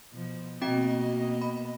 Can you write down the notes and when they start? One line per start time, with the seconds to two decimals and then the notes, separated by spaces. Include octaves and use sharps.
0.13 B2 F3
0.61 B2 A#3 C4 F#4 D#5 G5
1.41 B5